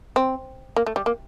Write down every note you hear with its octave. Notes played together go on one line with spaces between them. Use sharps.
C4
A#3
A3
G3
A#3